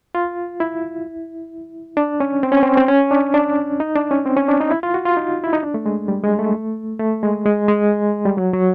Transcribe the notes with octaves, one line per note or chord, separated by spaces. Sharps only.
F4
E4
D4
C#4
C4
C#4
C4
C4
C#4
D4
D4
D#4
D4
C#4
C4
C#4
D4
D#4
E4
F4
F#4
F4
D#4
E4
D#4
D4
A3
G#3
G3
G#3
A3
A3
G#3
G#3
G#3
G3
F#3
F#3